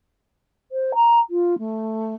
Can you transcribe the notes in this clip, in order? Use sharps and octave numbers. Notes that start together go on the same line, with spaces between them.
C5
A#5
F4
A3